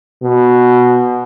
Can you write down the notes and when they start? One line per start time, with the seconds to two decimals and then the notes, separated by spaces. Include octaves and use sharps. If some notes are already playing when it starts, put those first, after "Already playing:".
0.23 B2